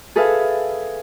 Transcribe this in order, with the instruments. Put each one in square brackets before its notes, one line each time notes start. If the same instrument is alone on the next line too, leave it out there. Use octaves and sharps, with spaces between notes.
[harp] G#4 A4 B4 E5 F5